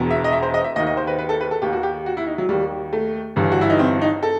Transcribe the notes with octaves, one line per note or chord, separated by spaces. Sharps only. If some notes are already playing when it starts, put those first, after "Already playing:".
Already playing: E1 E2 B2
E5
D#5
E5
C5
D#5
E5
D#2 D#3 D#5
D#5
C5
B4
B4
A4
B4
A4
D#2 D#3 G4
F#4
G4
F#4
E4
D#4
F#3
D#2 D#3 G3
A3
G1 G2 E3
F#4
E4
D#4
C4
D#4
A4